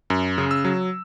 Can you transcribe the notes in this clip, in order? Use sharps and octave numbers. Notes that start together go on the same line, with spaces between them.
F#2
C#3
E6
F#3